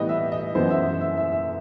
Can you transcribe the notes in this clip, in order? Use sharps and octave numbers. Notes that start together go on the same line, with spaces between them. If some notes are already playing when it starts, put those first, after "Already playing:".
Already playing: A2 E3 G3 B3 G4 B4 D#5
E5
D#5
F#2 E3 B3 C5
E5
E5
E5
E5